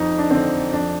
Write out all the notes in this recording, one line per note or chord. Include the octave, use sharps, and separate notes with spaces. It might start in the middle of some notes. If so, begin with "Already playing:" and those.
Already playing: F2 D#4
D4
D3 C4
F2 D4